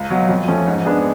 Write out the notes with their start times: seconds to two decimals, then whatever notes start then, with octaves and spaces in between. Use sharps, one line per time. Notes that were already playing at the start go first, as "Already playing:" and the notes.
Already playing: C#2
0.10 B2 F#3
0.29 F2
0.48 F3 A3 C#4
0.67 G#2
0.85 G#3 B3 D4 G#4